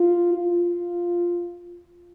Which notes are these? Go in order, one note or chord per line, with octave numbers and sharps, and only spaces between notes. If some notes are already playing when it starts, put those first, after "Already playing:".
Already playing: F4
F4